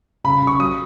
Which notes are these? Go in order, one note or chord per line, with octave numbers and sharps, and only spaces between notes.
C#3 B5
C#3
C#6
F#3 D#6